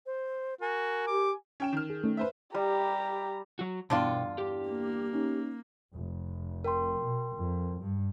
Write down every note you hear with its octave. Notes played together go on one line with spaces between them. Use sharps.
C5
F#4 A#4 G#5
G4 D6
C#4 G5 E7
D#3 F6
G#4
A3 C#4 D#4
B4 C5 E5
G3 G4 A#5
F#3 F#4
E2 G2 B2 D3 D4 F4 G5
G4
A#3
C#4 D#4
F1
A#4 G5 C6
B2
F2
G2